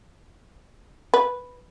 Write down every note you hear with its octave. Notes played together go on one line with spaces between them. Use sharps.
B4